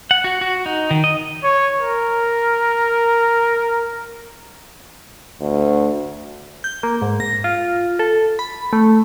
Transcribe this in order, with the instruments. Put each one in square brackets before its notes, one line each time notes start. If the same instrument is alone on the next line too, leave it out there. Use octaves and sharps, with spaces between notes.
[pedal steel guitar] F#5
F#4
F#4
D#4
D#3
D#5
[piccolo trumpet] C#5
A#4
[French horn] D2
[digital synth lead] G6
A#3
G#2
A#6
F4
A4
B5
A3